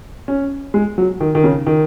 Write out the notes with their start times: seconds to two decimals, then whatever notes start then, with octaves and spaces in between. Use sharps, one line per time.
0.28 C#4
0.74 G#3
0.98 F#3
1.21 D#3
1.35 D#3
1.44 C#3
1.67 D#3